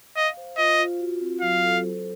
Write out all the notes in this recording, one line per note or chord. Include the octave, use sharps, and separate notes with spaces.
D#5 F5
C5
F4 D#5
F4
F#4
C4
F#3 F5
A4
C5